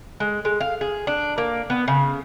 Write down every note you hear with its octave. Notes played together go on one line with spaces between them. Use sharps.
G#3
G#3
F5
G#4
D4
A#3
B3
C#3